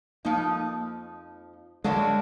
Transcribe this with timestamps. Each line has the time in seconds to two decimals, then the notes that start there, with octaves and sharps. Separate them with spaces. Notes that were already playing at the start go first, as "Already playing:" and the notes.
0.25 F2 F3 A#3 D#4
1.84 D3 F#3 G#3 A#3 D4 F#4